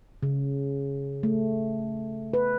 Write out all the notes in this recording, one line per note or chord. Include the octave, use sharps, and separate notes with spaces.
C#3
A3
B4